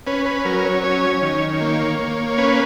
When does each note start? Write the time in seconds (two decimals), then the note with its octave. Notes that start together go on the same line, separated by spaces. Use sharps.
0.07 C#4 B4
0.26 B4
0.45 F#3 A#4
0.65 C#5
0.84 C#4 C#5
1.22 D#3
1.61 A#3
1.99 A#3
2.38 C#4 B4